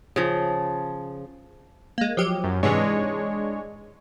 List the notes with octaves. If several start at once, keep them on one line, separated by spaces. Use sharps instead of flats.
C#3 F3
G#3 A#3
F3 F#3 G4
F#2
G#2 C3 E3 G#3 D4 C#5